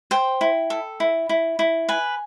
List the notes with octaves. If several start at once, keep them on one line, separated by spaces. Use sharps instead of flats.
C5 G5
E4
A4
E4
E4
E4
B4 G#5